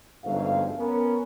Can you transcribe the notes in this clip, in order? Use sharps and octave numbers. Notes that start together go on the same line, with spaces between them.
G1 F2 G#2 F#3 A3 F5
B3 C#4 A#4